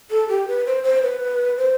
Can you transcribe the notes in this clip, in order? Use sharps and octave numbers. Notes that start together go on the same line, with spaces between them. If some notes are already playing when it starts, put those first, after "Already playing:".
A4
G4
B4
C5
C5
B4
C5